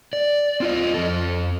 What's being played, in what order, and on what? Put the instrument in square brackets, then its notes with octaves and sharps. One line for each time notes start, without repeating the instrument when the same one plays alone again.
[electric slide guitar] D5
C4 F4 D#5
F2 A4